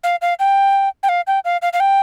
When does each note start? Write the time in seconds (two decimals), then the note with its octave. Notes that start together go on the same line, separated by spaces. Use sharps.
0.04 F5
0.22 F5
0.39 G5
1.03 G5
1.09 F5
1.27 G5
1.45 F5
1.62 F5
1.73 F5
1.80 G5